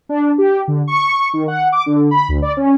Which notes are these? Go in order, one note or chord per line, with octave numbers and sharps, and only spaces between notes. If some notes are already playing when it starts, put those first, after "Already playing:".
D4
G4
D3
C#6
D#3
F#5
D6
D3
B5
D2
D5
C#4